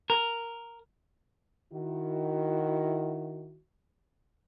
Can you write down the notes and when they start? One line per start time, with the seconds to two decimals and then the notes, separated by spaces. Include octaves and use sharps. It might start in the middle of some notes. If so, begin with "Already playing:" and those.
0.10 A#4
1.73 D#3 E4 F#4